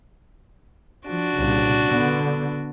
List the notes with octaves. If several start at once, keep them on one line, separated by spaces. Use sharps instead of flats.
F3 D4 F#4
C2 A#2 C#3
D3 B3